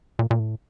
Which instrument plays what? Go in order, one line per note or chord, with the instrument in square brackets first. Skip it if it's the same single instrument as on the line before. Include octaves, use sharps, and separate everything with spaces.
[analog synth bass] A#2
A#2
A2